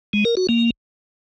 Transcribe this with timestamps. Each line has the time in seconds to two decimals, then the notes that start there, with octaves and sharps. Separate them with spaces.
0.13 G#3
0.25 A#4
0.37 F#4
0.49 A#3